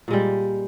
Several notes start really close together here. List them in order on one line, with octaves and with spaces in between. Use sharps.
A#2 G#3 G3